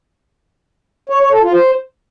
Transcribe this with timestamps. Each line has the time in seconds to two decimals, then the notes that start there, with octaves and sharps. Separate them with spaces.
1.09 C#5
1.21 C#5
1.32 A4
1.43 F4
1.54 C5